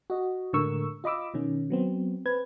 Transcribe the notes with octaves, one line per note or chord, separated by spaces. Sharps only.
F#4 D#5
A2 D3 G#3 A#4 C#6 E6
F4 D#5 B5 D6 E6
B2 D#3 C#4
F#3 B3 C4
C4 B4 G#6